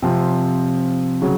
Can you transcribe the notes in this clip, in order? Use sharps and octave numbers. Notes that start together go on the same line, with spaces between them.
C3 F3 C4
C#3 F#3